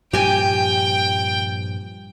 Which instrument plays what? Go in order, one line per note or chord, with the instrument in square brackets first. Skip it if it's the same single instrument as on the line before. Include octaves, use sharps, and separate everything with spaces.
[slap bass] G2 A#2 F3 [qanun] G4 G#5 [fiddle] G5